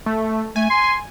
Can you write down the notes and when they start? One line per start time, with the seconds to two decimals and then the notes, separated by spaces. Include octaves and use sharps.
0.06 A3
0.56 A3 G#5
0.70 C6